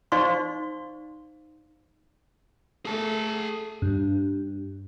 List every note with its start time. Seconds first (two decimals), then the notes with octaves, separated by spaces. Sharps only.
0.12 D#4 C5 D5 F5 C6 C#6
2.85 A3 G#4 A5
3.82 G2